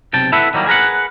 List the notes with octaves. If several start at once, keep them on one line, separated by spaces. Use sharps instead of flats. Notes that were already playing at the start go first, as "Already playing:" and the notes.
B1 C3 G5 A5
E4 A4 B4 E5 F#5
D#3 F#3 G3 A#3
G#4 A#4 B4 F#5